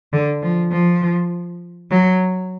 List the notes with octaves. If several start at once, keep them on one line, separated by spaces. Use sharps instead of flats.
D3
F3
F3
F#3